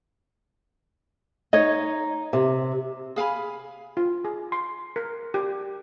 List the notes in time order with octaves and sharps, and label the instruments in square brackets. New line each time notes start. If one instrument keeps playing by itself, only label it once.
[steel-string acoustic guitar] D#4 [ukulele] C#5 D#5
[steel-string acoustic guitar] C3
[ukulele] G#4 F5 G#5 B5
[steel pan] F4
G#4
C6
A#4
G4